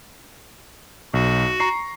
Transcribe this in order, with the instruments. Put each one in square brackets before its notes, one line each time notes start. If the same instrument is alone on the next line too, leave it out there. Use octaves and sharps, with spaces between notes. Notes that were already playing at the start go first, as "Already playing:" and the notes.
[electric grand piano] B1 [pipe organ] F#4
[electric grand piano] A#5 C#6 C7